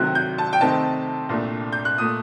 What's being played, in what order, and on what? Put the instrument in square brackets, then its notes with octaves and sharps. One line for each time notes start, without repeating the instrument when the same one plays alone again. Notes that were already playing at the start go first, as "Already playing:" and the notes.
Already playing: [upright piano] D2 C3 D#3 F#3 F#6
G6
A5
G5
C3 D#3 A3 C4 D#4 A5
C2 A#2 A3 D4
G6
F#6
A#2 A3 D#6